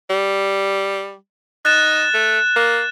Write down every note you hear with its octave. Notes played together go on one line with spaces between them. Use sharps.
G3
D#4 F#6 A6 E7
A3
A#3